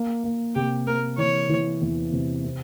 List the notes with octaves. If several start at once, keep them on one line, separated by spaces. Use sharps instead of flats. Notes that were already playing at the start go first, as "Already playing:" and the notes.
Already playing: A#3
A#3
C3 G4
A#3 A#4
E3 C#5
E3
E2
C3
C4